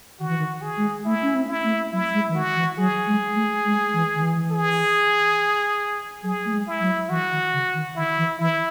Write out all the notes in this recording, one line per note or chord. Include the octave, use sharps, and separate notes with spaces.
D#3 F#4
E3
D#3
G#4
G#3
A3 E4
C#4
C4
E4
A3
F#3 E4
G#3
E3
D#3 F#4
E3
F#3 G#4
G#3
A3
G#3
E3
D#3
E3
G#4
F#3 G#4
A3
G#3
E4
F#3
E3 F#4
D#3
C#3
D#3
D#3 E4
E3
E3 E4